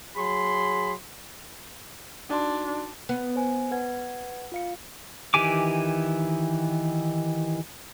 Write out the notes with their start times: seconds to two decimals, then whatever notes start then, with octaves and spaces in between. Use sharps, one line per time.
0.17 F#3 G#4 B5 C6
2.30 D4 D#4 F#4 C6
3.09 B3
3.36 C5 G#5
3.71 B4 F#5 G#6
4.52 F4 F5 C#7
5.34 D#3 E3 G4 G#5 D6